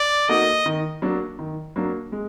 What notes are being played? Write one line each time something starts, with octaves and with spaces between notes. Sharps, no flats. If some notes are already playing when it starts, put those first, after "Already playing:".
Already playing: D5
A#3 D#4 F#4 A4 D#5
D#3
F#3 A#3 D4
D#3
F#3 A#3 D4
G#3